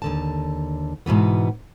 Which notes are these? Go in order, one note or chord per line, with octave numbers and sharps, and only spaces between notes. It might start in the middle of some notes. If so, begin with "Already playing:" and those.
D#2 D3 A5
G#2 B2 E3 B3